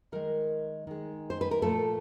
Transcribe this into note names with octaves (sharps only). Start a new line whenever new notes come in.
D#3 G#3 A#4
D#3 G#3
C5
B4
A#4
A#2 F3 A3 A4